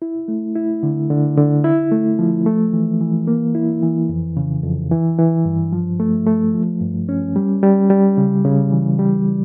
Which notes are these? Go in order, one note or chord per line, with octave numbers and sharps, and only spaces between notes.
E4
A3
E4
D3
D3
D3
E4
A3
F3
A3
E3
E3
A#3
E4
E3
F2
C#3
F2
E3
E3
G2
F3
A3
A3
F3
G2
C#4
G3
G3
G3
C#3
C#3
E3
G3